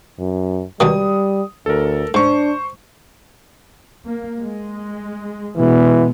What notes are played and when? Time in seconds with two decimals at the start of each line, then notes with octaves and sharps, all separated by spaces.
0.19 F#2
0.80 C#2 B2 D#3 G3 D#6
1.66 D2 A4 A#4
2.14 G#2 D4 C5 C#6
4.03 A#3
4.41 G#3
5.57 B2 E3 G#3 B3